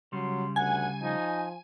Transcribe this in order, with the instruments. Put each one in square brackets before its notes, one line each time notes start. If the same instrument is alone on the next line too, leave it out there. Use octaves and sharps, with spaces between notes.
[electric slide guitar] C#3 G3 [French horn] F#3 [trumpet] C6
[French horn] D2 [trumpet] F#5 [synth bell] G#5
[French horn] F3 [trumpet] D#4